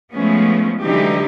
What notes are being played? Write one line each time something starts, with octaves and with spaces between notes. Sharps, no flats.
F3 G#3 A3 B3 C#4
D3 E3 F#3 G#3 D#4 G4